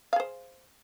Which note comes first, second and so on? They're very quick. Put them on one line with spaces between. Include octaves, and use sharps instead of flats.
F5 G#4 C5